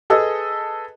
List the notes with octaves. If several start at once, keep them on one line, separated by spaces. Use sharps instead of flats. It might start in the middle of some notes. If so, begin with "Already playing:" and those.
G#4 A4 B4 D#5